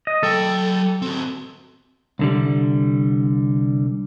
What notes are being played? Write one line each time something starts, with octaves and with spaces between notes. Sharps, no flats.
D#5
F#3 A4 G5
C4 F#4
C2 D3 G3